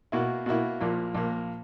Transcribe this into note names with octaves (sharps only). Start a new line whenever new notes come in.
B2 A#3 E4
B2 A#3 E4
A#1 A#2 A#3
A#1 A#2 A#3